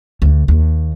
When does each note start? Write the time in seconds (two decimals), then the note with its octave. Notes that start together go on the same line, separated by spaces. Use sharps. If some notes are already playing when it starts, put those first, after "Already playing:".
0.22 D2
0.48 D#2